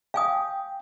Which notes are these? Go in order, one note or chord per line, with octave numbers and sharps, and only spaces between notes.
F5 G5 G#5 D#6